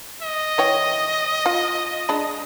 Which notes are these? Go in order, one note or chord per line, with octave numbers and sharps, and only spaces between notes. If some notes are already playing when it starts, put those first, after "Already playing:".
D#5
E3 C#5 G5
F4
G#3 D4 B5